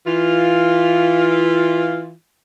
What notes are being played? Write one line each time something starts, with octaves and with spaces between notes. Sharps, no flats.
E3 F4